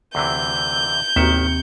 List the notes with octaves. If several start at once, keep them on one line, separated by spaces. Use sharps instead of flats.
D2 C3 E3 G6
A1 D#2 C3 D#3 D#4 F#4 E5 C#7